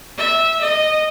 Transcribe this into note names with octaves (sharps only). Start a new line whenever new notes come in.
E5
D#5